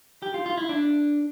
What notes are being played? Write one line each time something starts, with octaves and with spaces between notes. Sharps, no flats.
G4
F4
F4
E4
D4